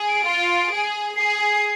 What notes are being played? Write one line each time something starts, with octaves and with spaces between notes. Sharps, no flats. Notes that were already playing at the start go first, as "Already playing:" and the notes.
Already playing: G#4
D7
F4
G#4
G#4 C7